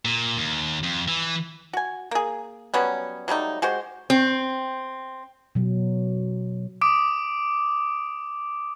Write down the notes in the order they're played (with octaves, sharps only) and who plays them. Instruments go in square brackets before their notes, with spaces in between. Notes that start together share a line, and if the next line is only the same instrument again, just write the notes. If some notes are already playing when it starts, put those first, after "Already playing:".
[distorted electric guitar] A#2
D#2
F2
E3
[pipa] F#4 G#5
A#3 G#4
F#3 G3 B3 C#4
F#3 G3 A3 D#4
G#3 F#4 G4 C5
[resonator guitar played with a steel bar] C4
[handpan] B2 F#3
[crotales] D6 D#6 D7